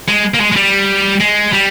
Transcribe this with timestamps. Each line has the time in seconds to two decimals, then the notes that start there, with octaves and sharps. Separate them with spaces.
0.08 G#3
0.34 A#3
0.40 G#3
0.52 G#3
0.56 G3
1.20 G#3
1.53 G3